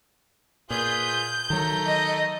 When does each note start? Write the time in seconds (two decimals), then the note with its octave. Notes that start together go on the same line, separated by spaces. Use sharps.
0.70 A#2 F4 G#4 B4 G6
1.50 D#3 F#3 A3 A#5
1.87 D#5